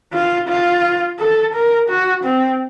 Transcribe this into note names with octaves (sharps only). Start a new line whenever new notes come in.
F4
F4
A4
A#4
F#4
C4